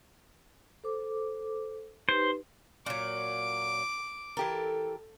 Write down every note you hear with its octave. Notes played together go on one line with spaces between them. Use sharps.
A4 C5 D6
D#4 G4 B4 C5
A#2 F#3 D6
E3 G4 A4 A#4